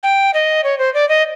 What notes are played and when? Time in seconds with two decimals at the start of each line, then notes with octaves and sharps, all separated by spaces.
0.03 G5
0.34 D#5
0.64 C#5
0.79 C5
0.94 D5
1.09 D#5